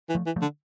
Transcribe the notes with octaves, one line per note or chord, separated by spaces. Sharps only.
E3
F3 A3
E3
F3 A3
D3